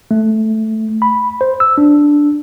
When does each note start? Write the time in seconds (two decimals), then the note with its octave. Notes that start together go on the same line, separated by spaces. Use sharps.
0.11 A3
1.02 B5
1.41 C5
1.60 E6
1.78 D4